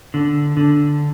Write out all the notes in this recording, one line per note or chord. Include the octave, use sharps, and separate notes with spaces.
D3
D3